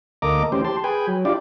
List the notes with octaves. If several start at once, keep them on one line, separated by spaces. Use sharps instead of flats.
D2 A#3 A4 D#5 A#5 D6
E3 A3 C#4 G4 C5
G4 A5 C6
G#4 B4 G5 G#5
F#3
D4 E4 F4 G4 D5